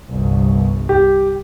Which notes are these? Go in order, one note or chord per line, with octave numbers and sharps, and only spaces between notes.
G1 C2
G4